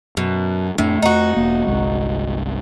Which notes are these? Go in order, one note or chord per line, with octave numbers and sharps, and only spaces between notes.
F#2 B2
F2 A2 A3 D4
F2 A3 D#4 F#4
E1 A#3
G1 C2 G#3